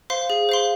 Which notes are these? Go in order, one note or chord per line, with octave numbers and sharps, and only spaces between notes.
C5 F5 C6
G#4
C5 F5 C6